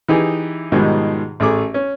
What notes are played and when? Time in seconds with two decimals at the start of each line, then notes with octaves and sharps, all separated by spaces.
0.08 E3 D#4 G4 G#4
0.72 G#2 B2 D#3 F3 G3 G#3
1.40 A1 A3 G#4 D6
1.74 C#4